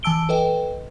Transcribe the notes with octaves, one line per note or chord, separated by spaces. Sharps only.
E3 G#5 A5 E6 D7 G7
A4 B4 D#5 G5